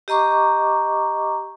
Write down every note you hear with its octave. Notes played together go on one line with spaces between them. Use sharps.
G4 D#5 A#5 C#6 D6